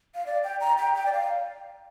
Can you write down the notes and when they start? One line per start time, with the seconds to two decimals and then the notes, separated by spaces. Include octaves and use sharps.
0.15 F5
0.26 D5
0.44 G5
0.61 A#5
0.78 G5
0.95 G5
1.06 D5
1.13 F5